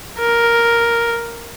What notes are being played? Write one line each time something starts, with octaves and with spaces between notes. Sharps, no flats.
A#4